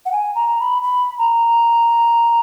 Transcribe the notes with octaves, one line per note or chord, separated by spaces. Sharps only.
F#5
G#5
A#5
B5
B5
A#5